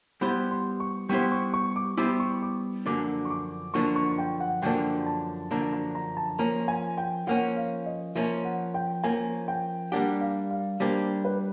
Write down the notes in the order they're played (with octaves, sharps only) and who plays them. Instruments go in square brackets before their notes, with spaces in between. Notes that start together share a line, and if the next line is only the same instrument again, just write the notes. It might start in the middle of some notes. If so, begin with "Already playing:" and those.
[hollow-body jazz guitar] G3 B3 E4 G4 C5 [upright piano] B5
[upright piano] C6
C#6
[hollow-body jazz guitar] G3 B3 E4 G4 C5 [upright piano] C#6
[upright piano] C#6
C#6
D6
[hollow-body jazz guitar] G3 B3 E4 G4 C5 [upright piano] D6
[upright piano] C#6
D6
[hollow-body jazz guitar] F#2 D3 F3 A#3 D4 [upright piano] D6
[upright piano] C#6
D6
[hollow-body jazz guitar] F#2 D3 F3 A#3 D4 [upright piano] C#6
[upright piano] C#6
G5
F#5
[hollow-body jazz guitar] F#2 D3 F3 A#3 D4 [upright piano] G5
[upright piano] A5
[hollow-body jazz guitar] F#2 D3 F3 A#3 D4 [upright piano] A#5
[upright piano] A5
A#5
A#5
A5
[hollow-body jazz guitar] F3 A#3 C#4 [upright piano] A#5
[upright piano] G#5
G5
[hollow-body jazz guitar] F3 A#3 C#4 [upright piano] F#5
[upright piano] F5
D#5
[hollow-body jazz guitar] F3 A#3 C#4 [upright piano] E5
[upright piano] F#5
G5
[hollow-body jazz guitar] F3 A#3 C#4 [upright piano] G#5
[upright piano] G5
[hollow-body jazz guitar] G3 A#3 D4 G4 [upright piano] F#5
[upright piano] F5
F5
[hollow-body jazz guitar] G3 A#3 D4 G4 [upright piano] C5
[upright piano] B4